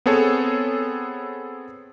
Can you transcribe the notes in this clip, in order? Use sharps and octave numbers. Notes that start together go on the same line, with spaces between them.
B3 C4 G#4 A4 C#5